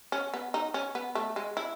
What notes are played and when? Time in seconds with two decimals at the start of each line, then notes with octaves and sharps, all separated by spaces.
0.12 C#4
0.34 B3
0.54 D#4
0.74 C#4
0.95 B3
1.15 A3
1.36 G#3
1.57 E4